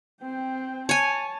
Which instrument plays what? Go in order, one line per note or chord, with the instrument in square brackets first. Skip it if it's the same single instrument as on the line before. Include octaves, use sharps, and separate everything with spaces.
[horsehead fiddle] C4 G5
[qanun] C#5 G#5 [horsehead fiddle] A5